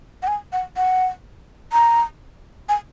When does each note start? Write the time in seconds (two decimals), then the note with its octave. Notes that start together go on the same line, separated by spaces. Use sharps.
0.23 F#5
0.28 G#5
0.53 F#5
0.77 F#5
1.72 A#5
2.69 G#5